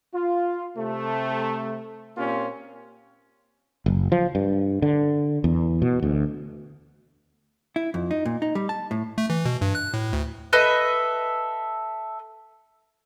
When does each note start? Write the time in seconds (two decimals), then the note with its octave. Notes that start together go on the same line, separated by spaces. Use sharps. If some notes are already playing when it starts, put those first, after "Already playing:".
0.14 F4
0.77 C3 A3
2.17 A#2 A#3 C4 C#4 F4 G4
3.86 F#1
4.12 F3
4.35 G2
4.82 D3
5.44 E2
5.82 B2
6.03 D2
7.76 E4
7.94 F2
8.11 D#4
8.25 A#2
8.42 D#4
8.55 G3
8.69 A5
8.91 A2
9.18 A3
9.30 E3
9.45 B2
9.61 G2
9.75 F#6
9.94 A2
10.13 D2
10.53 A4 B4 D#5 E5